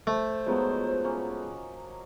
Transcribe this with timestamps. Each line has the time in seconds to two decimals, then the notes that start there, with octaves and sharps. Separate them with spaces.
0.07 A3 C5
0.46 F3 F#3 G#3 B3 D#4
1.03 A#3 C#4